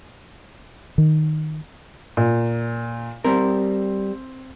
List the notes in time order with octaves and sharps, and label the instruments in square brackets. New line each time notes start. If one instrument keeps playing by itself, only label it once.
[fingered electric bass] D#3
[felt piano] A#2
[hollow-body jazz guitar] G3 A#4 [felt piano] C4